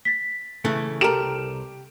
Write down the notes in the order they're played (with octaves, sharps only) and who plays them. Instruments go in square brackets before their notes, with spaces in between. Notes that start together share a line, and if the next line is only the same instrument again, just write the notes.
[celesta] A6 B6
[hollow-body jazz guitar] C#3 E3 A3
[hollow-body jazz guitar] C2 A#4 [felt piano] G4 D7 E7 [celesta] A4 A5